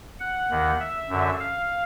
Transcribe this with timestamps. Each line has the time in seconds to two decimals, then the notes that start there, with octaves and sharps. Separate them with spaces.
0.20 F#5
0.50 D#2 D#3
0.80 E5
1.09 F#2 D3
1.40 F5